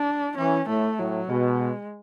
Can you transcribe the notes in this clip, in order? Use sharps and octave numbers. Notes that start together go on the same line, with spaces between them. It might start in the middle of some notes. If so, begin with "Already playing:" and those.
Already playing: D4
E3 C#4
A2 A3
A2 F#3
B2 G#3